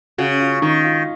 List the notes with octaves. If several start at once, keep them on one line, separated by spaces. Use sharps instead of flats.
C#3 F#4
F4
D#3 D#4
F4